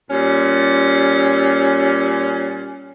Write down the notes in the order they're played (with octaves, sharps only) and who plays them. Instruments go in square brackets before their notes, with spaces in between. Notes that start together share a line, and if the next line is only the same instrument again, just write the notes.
[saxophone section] A#2 G3 C#4